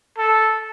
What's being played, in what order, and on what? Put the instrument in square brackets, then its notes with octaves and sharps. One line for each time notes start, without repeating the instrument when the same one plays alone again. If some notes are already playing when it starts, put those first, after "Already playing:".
[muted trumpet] A4